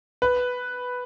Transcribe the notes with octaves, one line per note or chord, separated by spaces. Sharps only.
B4